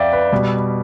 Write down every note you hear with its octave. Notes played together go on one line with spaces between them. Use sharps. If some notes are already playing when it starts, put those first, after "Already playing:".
Already playing: F2 D5 E5 F5 G5
B4
B2 G3